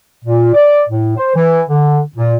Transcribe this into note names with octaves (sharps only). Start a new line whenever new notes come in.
A#2
D5
A2
C5
E3
D3
A#2